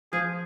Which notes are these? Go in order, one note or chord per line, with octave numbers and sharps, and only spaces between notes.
F3 G#4